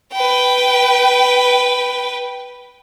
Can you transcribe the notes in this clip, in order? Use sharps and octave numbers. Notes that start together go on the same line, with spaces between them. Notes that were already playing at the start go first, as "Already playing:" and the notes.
B4 G5